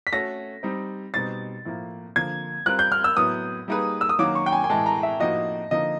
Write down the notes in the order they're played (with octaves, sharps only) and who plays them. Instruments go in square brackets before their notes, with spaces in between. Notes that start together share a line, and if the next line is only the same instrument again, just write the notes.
[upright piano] B6
[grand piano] A3 C#4 F#4 A4 [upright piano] A#6
[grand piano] G3 C4 D#4
[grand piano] B2 G3 C4 D#4 [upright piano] A6
[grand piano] A2 F3 A#3
[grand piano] D3 F3 A#3 [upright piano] G#6
[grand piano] G3 C4 F4 A#4 [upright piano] F#6
[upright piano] G6
F6
E6
[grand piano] A2 F#3 B3 [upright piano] D#6
[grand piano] G3 A#3 D#4 G#4 B4
[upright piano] E6
D#6
[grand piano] D#3 F#3 A#3 C#4 F#4 [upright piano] D6
[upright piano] C#6
G5
G#5
G#5
[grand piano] A2 E3 G#3 [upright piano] A5
[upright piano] A#5
E5
[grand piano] A2 F3 A#3 D#4 F#4 [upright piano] D#5
[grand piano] D3 F3 A#3 D#4 [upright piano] D#5